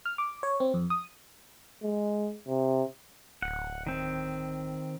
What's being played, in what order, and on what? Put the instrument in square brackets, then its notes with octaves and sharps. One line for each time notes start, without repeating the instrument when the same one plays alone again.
[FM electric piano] F6
D6
C#5
C4
F2
D#6
[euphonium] G#3
C3
[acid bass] D1 [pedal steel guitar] F#5
[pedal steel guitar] D#3 C4